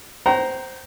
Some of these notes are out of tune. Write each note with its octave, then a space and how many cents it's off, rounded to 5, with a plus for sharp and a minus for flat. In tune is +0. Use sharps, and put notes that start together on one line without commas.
C5 +0 G5 -45 A#5 +0